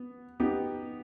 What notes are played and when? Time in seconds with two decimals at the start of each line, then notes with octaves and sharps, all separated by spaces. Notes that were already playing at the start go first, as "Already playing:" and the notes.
Already playing: B3
0.40 B3 D#4 G4